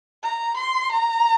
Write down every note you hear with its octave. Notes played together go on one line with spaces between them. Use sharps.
A#5
C6
A#5